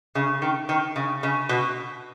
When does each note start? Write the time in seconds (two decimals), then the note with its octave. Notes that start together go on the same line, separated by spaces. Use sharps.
0.15 C#3
0.42 D#3
0.69 D#3
0.96 C#3
1.23 C#3
1.49 B2